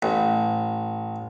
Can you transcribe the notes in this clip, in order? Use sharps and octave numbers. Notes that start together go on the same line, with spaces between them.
A1